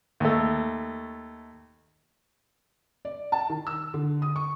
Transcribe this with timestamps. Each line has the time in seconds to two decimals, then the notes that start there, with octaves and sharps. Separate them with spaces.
0.20 D#2 A3
3.05 D5
3.32 A5
3.50 D#3
3.67 E6
3.94 D3
4.22 D#6
4.36 C#6